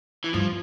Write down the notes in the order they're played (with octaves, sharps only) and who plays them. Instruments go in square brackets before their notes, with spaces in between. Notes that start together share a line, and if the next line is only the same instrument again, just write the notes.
[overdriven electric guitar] E3
[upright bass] G2 [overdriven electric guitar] F3